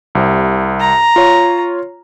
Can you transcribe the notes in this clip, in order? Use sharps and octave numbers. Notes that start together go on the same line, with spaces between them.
C2 C3
A#5
F4 C#5